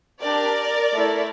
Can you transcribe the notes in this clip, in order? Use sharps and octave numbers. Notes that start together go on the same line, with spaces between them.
D4 G4 A#4 D5
A3 E4 A4